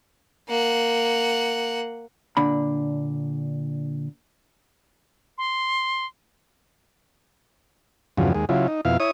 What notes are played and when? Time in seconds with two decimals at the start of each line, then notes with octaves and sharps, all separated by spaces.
0.49 A#3 F#5
2.37 A#2 D3 D4 B5
5.38 C6
8.17 E2 G2 C#3 F3 F#3
8.35 D#2 G#3
8.49 C#3 F#3 E4 F4
8.68 D#4
8.85 F2 B2 E4 F5
9.00 E4 C#5 D#6